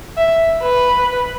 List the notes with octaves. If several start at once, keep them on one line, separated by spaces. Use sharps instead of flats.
E5
B4